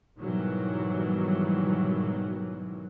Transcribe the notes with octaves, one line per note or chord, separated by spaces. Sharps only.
G#2 B2 D#3 E3 F#3 G3